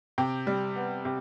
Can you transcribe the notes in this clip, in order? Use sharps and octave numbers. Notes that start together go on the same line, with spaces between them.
C3 G5
G3
B3
C3